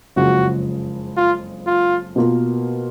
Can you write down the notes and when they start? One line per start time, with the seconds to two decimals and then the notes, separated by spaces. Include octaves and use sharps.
0.16 F#1 F2 C#3 G#3 F#4
1.17 F4
1.66 F4
2.16 B2 A#3 F4 A#4